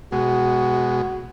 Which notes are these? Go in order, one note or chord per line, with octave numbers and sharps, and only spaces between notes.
B2 G#3 F#4